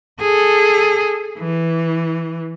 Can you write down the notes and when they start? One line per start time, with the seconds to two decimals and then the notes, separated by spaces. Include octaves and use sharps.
0.20 G#4 A4
1.39 E3